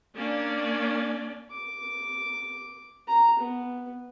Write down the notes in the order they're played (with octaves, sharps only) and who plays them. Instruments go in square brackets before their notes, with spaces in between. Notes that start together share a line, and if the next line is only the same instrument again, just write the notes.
[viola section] A#3 C#4 D4 D5
[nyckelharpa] D6
A#5
B3